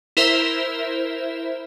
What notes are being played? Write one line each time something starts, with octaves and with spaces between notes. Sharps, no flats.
E4 A#4 C5 E5